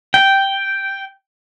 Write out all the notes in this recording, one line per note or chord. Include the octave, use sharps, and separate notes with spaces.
G5